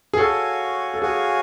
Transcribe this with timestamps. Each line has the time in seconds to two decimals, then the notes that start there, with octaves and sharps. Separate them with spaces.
0.13 G#4
0.18 F#4 A4 C#5 F5 G#5
0.94 A4
1.02 F#4 G#4 C#5 F5 G#5